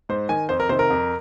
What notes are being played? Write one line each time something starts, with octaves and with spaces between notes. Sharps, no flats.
G#2 C5
D#3 G#5
F2 C5
A#4
C3 D#3 C5
A#4
F2